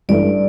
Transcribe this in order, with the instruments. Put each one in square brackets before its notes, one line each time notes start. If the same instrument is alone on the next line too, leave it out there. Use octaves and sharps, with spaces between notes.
[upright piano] A1 G2 E3 A3 [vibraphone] D5